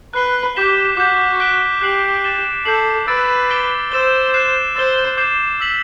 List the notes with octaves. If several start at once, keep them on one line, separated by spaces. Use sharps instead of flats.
B4 F#6 C7 G7
G4 D6 G6 B6 E7 G7
F#4 D6 G6 B6
F#6 B6 D7 G7
G4 F#6 C7 F#7
A6 E7 G7
A4 D6 G6 C7 F#7
B4 E6 A6 D7
D6 A6 D7 G7
C5 E6 A6 E7 G7
F#6 C7 E7
C5 E6 A6 E7 G7
D6 G6 C7 E7 G7
E6 B6 F#7